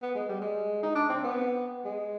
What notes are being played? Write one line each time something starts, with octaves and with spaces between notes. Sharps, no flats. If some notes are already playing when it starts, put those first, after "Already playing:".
B3
G#3
G3
G#3
D#4
D4
C4
B3
G#3